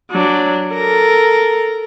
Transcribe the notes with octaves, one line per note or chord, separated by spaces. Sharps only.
F#3 D4
A4 A#4